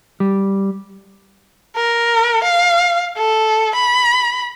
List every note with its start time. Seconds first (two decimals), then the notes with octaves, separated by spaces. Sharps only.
0.20 G3
1.76 A#4
2.44 F5
3.17 A4
3.75 B5